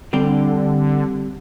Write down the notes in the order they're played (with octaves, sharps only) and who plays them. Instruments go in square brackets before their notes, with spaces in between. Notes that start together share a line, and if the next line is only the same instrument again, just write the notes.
[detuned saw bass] D3 [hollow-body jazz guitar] G3 C4 G4